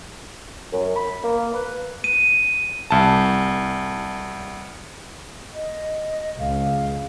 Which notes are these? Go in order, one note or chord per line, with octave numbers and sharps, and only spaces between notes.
F#2
B5
A#3
B4
D#7
C2 A5
D#5
C#2 F5